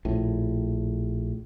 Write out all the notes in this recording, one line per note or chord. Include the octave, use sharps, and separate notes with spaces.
A#1 A2